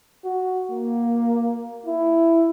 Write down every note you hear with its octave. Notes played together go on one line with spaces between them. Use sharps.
F#4
A#3
E4